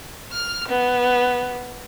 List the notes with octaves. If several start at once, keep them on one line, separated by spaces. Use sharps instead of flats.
F6
B3